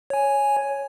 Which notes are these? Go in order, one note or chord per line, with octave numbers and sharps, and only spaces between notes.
C#5 G#5